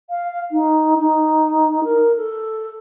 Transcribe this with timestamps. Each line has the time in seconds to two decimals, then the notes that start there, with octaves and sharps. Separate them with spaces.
0.10 F5
0.51 D#4
0.99 D#4
1.83 A#4
2.17 A4